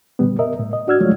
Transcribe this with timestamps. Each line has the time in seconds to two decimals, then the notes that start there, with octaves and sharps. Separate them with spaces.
0.19 A#2 D3 G3 B3
0.39 A#4 D#5 E5
0.59 A2
0.73 D#5
0.87 D4 F#4 D5 E6 F6 G#6
1.01 F3 F#3 G#3 A3 F4 C#5